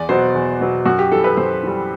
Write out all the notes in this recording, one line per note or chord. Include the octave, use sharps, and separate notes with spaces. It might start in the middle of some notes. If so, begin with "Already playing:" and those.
Already playing: E2 D5
B2 F#3 B3 C5
E2
B2 F#3 B3
F#2 F#4
G4
E3 G3 A4
B4
F#2 C5
E3 G3